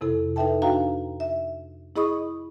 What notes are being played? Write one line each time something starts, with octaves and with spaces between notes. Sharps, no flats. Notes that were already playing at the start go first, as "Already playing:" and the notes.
F2 C3 E4 A4
D#4 A4 B4 E5 G5 A5
D4 F#4 F5 G5 A#5
E5
E4 G#4 D#5 B5 C#6 D#6